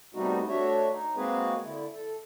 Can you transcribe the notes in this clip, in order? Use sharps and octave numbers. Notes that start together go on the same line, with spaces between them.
C3 G3 A3 B3 D#4 F#4
A3 D4 F#4 C#5 E5
D#4
G#3 A#3 C4 F#4 G#4 B4
D3 E4
A4